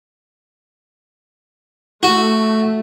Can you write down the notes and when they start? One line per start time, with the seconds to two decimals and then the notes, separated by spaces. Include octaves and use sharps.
2.03 A3 F#4